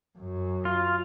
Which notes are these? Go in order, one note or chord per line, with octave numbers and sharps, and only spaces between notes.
F#2
F4